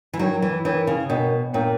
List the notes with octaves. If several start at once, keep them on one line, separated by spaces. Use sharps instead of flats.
E3
F#3 D4 A#4 C#5 G5
E3
E3 D4 A#4 C#5 G5
C#3
B2 D4 A#4 C#5 G5
A#2 D4 A#4 C#5 G5